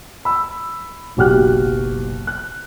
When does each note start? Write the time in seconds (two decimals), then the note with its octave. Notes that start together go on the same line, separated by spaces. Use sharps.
0.25 B5 E6
1.17 F#1 B1 F#4 G4 F6 F#6
2.27 F#6